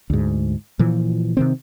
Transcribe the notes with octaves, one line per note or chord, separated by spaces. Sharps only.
D2 G#2
A#2 E3 F3
C3 D#3 C4